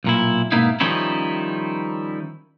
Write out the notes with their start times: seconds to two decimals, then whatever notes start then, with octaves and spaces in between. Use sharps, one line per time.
0.04 B1 A#2 E4
0.52 G#2 B2 A#3 B3 D#4 E4
0.80 D#3 F3 G3 C#4 D#4 E4